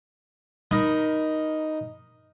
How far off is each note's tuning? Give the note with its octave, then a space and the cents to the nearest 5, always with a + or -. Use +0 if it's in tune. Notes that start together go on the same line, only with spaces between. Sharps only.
D#4 +0 A#4 +15 B5 +0